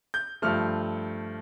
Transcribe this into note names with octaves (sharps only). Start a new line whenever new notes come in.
G6
G2 F3 A3 F6